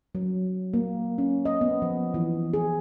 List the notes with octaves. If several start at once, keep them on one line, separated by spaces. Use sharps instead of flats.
F#3
A#3
C#4
D#5
B3
F3
E3
G#4